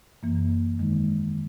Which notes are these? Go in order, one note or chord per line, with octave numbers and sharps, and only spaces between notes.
F#2 E3 A#3
E2 D#3 G#3 D#4